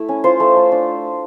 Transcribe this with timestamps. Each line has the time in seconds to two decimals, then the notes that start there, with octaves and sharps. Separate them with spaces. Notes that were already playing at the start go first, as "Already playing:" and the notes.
Already playing: A3 E4
0.09 C#4
0.24 F4 C5
0.40 A3
0.56 A3
0.72 D4